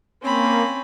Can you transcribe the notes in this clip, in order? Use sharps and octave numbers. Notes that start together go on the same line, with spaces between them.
A#3 C4 C#4 B5